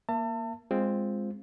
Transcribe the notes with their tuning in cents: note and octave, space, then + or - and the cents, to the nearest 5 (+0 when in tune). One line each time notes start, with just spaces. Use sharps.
A#3 +10 E5 +30 A5 +35
G#3 -10 C4 +0 F4 +0